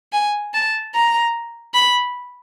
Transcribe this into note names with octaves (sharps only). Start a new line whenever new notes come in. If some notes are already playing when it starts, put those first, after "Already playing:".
G#5
A5
A#5
B5